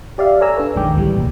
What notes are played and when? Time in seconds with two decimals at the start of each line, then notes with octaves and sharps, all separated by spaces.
0.18 G4 D5 E5 F5
0.40 A4 C#5 D5 G#5 A#5 E6
0.57 D4 B4
0.75 A#1 F2 D#3 G#3 G5 D6
0.94 D2 A2 E3 G3
1.16 C2 A#2